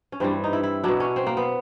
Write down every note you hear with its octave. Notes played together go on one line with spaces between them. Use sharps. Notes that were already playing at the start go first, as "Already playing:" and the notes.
C#4
G2 E3 G3 C4
D#4
E4
E4
B2 F#3 D4
C#4
C4
A#3
B3